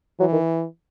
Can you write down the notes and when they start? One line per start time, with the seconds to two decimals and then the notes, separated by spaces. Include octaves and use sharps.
0.20 E3 F#3
0.32 D#3